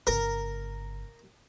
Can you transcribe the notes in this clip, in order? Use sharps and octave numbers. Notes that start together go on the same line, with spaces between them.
G1 C#3 A#4